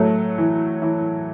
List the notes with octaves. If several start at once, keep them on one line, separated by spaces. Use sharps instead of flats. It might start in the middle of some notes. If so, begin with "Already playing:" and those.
Already playing: A2 F#3 A3
E3
E3